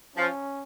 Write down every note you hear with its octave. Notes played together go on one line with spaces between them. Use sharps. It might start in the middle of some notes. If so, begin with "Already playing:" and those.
F3 C#4